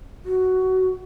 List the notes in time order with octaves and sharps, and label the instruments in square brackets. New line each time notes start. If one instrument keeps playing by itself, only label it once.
[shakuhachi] F#4